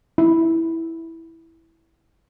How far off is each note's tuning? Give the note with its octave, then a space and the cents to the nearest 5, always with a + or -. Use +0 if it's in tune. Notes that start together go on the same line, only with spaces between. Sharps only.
E4 -5